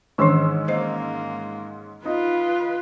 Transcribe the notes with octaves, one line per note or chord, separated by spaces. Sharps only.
G#2 D#3 E3 C#4 D4 E6
A#3 C5 D#5
D#4 F4 B4